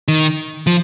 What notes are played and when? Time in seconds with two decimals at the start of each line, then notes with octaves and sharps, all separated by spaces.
0.08 D#3
0.67 F3